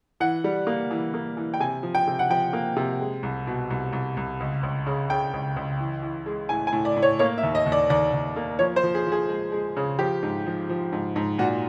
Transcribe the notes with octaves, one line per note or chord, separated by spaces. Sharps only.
E3 F#5
G3
A#3
E3
A#3
E3
G5
C3 G#5
F3
G5
C3
F#5
F3 G5
A#3
C3
G#3
C2
B2
C2
C2
C2
C#2
C#2
C#3
C#3 G5
C#2
C#2
E3
E3
G#3
A2 G#5
G#5
A2
D5
A2
C#5
A#3 C#5
E5
D#2
D#5
D#2
D5
D#2 D5
D#2
A#3
F3 C#5
C5
F3
G#4
F3
G#4
G#3
G#3
C#3
F3 G4
G#2
F3
F3
G#2
G#2
A#2 F#4